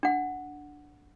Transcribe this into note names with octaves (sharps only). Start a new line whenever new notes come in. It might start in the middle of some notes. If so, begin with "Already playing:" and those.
D4 F#5